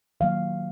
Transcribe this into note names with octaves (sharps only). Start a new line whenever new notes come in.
D#3 F#3 A#3 F5